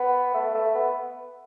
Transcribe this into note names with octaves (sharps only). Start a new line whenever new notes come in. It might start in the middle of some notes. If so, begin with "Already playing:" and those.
Already playing: B3
A3
A3
B3